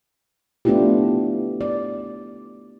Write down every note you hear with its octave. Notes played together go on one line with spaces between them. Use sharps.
A3 B3 D4 E4 F4 G4
D5